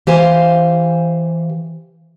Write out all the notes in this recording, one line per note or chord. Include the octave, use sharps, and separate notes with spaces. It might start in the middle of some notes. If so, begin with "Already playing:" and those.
E3 G4 C5 F5 G#5